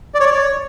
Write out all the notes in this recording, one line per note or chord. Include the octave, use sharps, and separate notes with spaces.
D5
C#5
D5
C#5